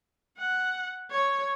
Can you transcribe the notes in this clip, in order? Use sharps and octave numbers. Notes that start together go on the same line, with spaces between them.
F#5
C#5